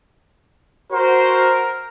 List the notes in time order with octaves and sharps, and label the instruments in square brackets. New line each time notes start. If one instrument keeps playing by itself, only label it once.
[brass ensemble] F#4 C5 [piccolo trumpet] A#4